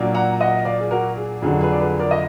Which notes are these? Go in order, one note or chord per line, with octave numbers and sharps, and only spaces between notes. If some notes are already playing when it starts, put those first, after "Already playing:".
Already playing: A#2 F#3 A#3 D4
F#5 A#5
D#5 F#5
D5 F5
G#4
F#4 A#4
G#4
F2 D3 F#3 G#4
G#4 B4
D5
G#4 B4
A#4 D5
D#5